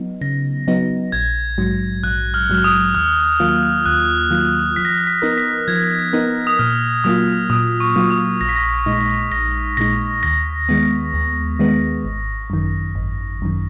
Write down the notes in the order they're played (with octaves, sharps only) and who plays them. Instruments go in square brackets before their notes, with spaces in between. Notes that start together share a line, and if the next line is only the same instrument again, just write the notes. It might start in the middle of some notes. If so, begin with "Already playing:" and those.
Already playing: [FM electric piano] F#3 B3 D#4
[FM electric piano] C#3 [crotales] A#6
[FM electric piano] F#3 B3 D#4
[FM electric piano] A#1 [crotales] G#6
[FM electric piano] G#2 F#3
[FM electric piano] A#1 [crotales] F#6
[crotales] F6
[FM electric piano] G#2 F#3 [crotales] F6
[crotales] D#6
[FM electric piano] D#2 [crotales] F6
[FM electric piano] D#3 F#3 A#3 F4
[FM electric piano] D#2 [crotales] F#6
[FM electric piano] D#3 F#3 A#3 F4
[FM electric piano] F3 [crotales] B6
[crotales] A#6
B6
B6
[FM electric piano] B3 D#4 A#4
[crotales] B6
[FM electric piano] F3 [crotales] G#6
[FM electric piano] B3 D#4 A#4
[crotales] D#6
[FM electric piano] A#2 [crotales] F6
[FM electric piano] F#3 A#3 F4 [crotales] D#6
[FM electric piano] A#2 [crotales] D#6
[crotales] C#6
[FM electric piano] F#3 A#3 F4
[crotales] D#6
[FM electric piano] A#1 [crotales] A#6
[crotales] B6
A#6
[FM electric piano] A#2 G#3 D#4
[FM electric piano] A#1 [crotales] A#6
[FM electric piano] A#2 G#3 D#4 [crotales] A#6
[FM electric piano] D#2 [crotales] A#6
[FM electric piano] D#3 G#3 B3
D#2
D#3 G#3 B3
G#1
F#2 D#3
G#1
F#2 D#3